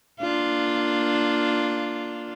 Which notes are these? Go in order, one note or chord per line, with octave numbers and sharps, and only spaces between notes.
A#3 D4 F4